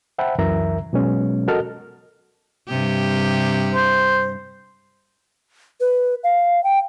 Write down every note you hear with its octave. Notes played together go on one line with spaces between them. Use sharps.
C5 E5 F#5 G5 A5 B5
C#2 F#2 E3 A#4 E5 A#5
B2 F#3 G#3 B3 C#4
F#4 A4 A#4 D#5 A5 F6
G2 C3 G4
C5
B4
F5
G5